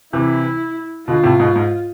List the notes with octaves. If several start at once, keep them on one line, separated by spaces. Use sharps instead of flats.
C3 E3 E4
B2 D3 F4
A2 C3
G#2 B2
G#2